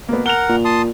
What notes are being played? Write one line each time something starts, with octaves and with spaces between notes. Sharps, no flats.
B2 A#3 B3
A#4 F#5 F7 G7
A#2
A5 C6 D#6